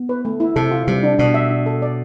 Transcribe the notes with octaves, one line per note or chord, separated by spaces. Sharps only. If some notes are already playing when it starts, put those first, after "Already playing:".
Already playing: B3
B4
A3
E4
C3 A4
F4
C3 G3
D4
B2 D4
E5
D4
A4
D5